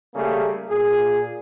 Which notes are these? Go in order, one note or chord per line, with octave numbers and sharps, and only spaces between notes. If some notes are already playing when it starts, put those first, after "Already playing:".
C#3 G3 A3 A#3 G#4
A#2 G#4